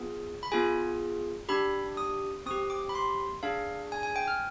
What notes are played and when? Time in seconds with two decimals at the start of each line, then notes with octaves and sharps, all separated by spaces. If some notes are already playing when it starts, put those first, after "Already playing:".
Already playing: B3 F4 G#4
0.43 B5
0.52 B3 F4 G#4 G#5
1.49 D4 G4 B5
1.97 D#6
2.46 C4 D#6
2.51 G4
2.70 D6
2.89 B5
2.95 C6
3.43 D4 G#4 F5
3.92 G#5
4.03 G#5
4.16 G5
4.28 F6